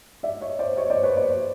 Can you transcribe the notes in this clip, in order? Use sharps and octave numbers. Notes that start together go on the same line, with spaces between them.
D5 E5
C#5 D#5
C5 D5
C#5 D#5
C5 D5
B4 C#5
C5 D5